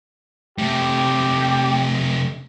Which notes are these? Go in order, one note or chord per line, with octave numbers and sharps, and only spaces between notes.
C3 A3 G4